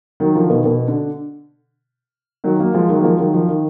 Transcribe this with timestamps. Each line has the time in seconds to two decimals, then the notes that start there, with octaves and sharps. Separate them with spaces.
0.20 D#3 F#3
0.35 D3 F3
0.50 B2 D#3
0.65 B2
0.88 D3
2.44 D#3 F#3
2.59 F#3 A#3
2.74 F3 G#3
2.89 D#3 F#3
3.00 A#3
3.04 F3 G#3
3.19 D#3 F#3
3.34 F3
3.48 D#3